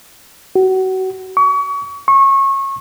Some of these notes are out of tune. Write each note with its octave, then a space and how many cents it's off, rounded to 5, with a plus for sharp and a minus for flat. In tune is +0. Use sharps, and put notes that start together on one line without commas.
F#4 +30
C#6 +35
C#6 -25